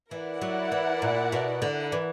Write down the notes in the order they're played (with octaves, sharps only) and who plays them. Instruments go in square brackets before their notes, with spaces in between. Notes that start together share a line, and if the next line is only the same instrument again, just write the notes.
[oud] E3 [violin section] E4 A#4 D5 F#5
[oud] F#3
E3
A#2
B2
D3
E3